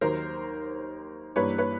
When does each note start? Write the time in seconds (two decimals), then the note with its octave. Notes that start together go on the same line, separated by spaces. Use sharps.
0.01 D#2 D#3 F#3 A#4 C5
1.36 G2 E3 G3 A#3 B4 C#5
1.58 B4 C#5